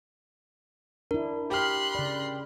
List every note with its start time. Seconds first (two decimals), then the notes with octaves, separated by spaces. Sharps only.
1.11 D4 E4 A#4
1.50 G4 B5 C6 F6 F#6
1.95 C#3 D5